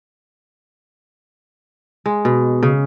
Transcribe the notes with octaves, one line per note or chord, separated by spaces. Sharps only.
G#3
B2
C#3